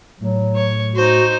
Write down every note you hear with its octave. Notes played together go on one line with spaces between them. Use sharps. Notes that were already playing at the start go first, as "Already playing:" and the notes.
A2 F#3
C#5
D#4 F#4 C5